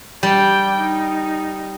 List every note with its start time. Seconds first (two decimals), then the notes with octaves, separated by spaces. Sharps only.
0.23 G3 D5 G5
0.78 D#4